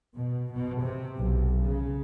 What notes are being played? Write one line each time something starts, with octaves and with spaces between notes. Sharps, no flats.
B2
B2
C3
B1
C#3